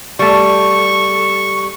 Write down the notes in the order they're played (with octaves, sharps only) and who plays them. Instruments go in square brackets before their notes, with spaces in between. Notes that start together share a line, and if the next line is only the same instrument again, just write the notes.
[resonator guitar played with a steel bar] G3 A3 [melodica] C#6